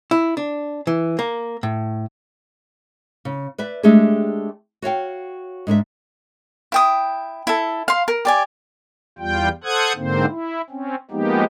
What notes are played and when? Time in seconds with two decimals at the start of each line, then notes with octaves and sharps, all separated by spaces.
0.11 E4
0.37 D4
0.87 E3
1.19 A#3
1.63 A2
3.25 C#3
3.58 B4 D5 E5
3.83 G#3 A3 D4 G4 G#4
4.82 F#4 C#5 F5 G5
5.67 G#2 D4 C5 E5
6.72 E4 G5 D#6
7.47 E4 A4
7.88 F5 C6
8.08 A#4
8.25 G4 D5 G#5
9.19 E2 G3 F4 G5
9.64 A4 C5 F#5 D#6 F#6 G#6
9.96 G#2 D3 A#3 C4 C5
10.29 E4
10.70 C4 C#4
11.11 F3 G#3 A#3 B3 D#4 G4